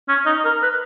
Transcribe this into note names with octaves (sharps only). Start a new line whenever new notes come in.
C#4
D#4
A#4
B4